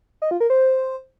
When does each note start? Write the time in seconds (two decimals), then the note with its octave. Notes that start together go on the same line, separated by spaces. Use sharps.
0.22 D#5
0.31 F4
0.40 A#4
0.50 C5